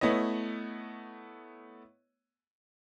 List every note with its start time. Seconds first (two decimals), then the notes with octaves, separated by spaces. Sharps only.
0.01 A3 B3 E4 C#5 D#5